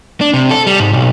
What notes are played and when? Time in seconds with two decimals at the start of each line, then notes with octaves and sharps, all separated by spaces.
0.21 D4
0.34 C3
0.51 A4
0.67 G3
0.80 G#2
0.93 B1